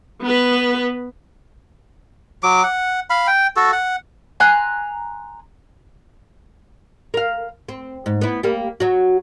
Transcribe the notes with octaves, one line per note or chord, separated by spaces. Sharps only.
B3 B4
F#3 D6
F#5
F5 B5
G5
F#4 A4
F#5
G#5 A#5 C6 F#6
A#4 F5
C4
G#2
B3 E4
G3 A#3
F#3 F#4